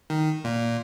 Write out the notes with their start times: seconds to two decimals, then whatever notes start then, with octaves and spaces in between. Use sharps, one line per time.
0.10 D#3
0.44 A#2